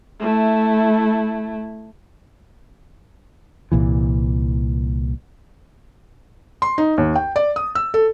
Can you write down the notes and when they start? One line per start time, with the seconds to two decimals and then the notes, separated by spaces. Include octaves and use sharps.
0.20 A3 E4
3.72 C2 A#2 E3
6.62 C6
6.78 D#4
6.98 D#2
7.16 G5
7.36 D5
7.56 D#6
7.75 E6
7.94 A4